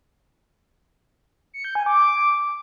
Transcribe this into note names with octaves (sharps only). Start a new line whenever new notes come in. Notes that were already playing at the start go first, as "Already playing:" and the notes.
C#7
G6
G#5
D6